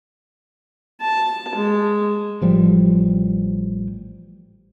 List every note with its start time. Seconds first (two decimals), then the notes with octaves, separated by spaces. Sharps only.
1.01 A5
1.55 G#3
2.41 A1 F3 G3